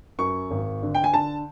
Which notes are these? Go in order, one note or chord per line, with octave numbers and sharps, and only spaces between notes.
F#2 C#6
G#1
D3
G5
G#5
D3 A5